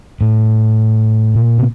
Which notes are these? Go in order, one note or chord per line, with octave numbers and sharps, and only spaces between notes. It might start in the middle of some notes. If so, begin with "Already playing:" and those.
A2
A#2
C3